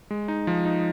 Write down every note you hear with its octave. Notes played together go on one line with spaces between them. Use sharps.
G#3
D#4
F3
D#4